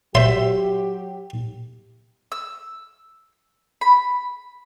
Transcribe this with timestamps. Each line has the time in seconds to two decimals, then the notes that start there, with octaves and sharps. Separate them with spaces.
0.15 F#3 G4 C5 E5 C6
2.32 E6
3.81 B5